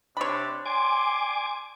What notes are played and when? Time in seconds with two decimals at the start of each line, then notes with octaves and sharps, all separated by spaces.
0.17 C3 D4 C#5 B5
0.66 D5 G5 G#5 C6 D6